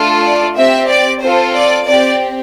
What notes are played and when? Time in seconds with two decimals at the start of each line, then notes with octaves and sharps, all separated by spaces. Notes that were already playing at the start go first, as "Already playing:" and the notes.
Already playing: A3 D4 F4 A4
0.23 D5
0.56 C4 G4 E5
0.88 D5
1.21 C4 F4 A4 C5
1.54 D5
1.86 C4 G4 D5